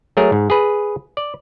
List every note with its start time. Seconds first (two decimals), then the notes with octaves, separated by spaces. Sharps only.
0.17 F#3 A3 G#4 A#4
0.32 G#2
0.50 G#4 B4
1.17 D5